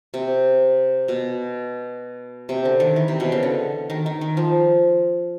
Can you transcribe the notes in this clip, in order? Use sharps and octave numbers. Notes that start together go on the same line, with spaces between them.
C3
B2
C3
D3
D#3
E3
C3
B2
C#3
D3
D#3
D#3
D#3
F3